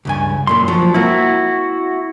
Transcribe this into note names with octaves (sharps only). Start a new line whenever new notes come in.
C#2 G2 G#5
F#2 A#2 A4 C6
F3 F#3
A#3 C4 E4 F#4 A#4